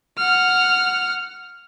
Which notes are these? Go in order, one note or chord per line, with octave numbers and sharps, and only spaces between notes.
F#5 F6